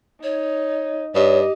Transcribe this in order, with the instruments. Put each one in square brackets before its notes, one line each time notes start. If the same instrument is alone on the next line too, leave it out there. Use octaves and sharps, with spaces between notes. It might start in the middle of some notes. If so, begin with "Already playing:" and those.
[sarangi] D#4 [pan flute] C#5
[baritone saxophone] G2 [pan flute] G4 [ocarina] C#5 [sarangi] D#5